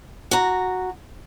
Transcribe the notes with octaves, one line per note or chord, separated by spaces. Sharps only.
F#4 A#5